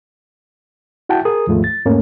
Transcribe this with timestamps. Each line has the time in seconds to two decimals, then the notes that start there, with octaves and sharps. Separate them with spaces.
1.09 E4 F#4 F#5 G5 A5
1.25 G#4 A#4 D#6
1.47 D#2 G#2 F3 G#3 A3 F4
1.64 A6
1.85 E2 G#2 A3 A#3 C#4